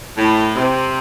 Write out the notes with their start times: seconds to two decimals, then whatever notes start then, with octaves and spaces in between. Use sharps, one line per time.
0.17 A2
0.55 C3